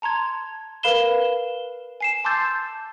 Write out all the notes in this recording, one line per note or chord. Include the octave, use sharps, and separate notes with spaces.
A5 A#5 C6 G#6
A#4 B4 F5 B5 E7 G7
G#5 C7 E7
A5 C6 D6 E6 G6 A6